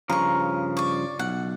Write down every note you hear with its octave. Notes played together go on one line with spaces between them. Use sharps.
G2 C#3 F3 A#5 C#6
D5 C#6
B1 F#5